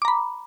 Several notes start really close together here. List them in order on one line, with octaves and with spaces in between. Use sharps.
D6 A#5 B5